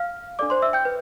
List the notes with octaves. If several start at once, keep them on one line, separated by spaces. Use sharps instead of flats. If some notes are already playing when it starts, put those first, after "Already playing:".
Already playing: F5 F6
D4 A4 D5 D6
C5 C6
E5 E6
G5 G6
B4